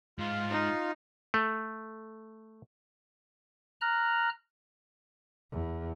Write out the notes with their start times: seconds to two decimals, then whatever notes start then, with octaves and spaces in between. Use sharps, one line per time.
0.19 G#2 F4
0.51 D#4
1.34 A3
3.81 A#5 F6 F#6
5.52 E2